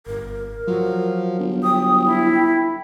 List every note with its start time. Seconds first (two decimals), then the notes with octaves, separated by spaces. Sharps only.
0.07 G1 A#4
0.68 F3 F#3
1.39 G1
1.63 G5 D#6
2.05 E4